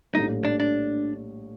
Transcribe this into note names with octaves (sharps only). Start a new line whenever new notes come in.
A#1 A2 G3 D#4
D4
D4